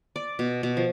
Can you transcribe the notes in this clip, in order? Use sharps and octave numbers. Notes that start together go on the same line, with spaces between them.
D5
B2
B2
F3